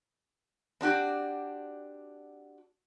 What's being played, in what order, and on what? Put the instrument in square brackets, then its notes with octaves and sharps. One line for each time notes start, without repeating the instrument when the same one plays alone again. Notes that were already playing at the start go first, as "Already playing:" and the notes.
[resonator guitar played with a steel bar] C4 D4 F#4 G4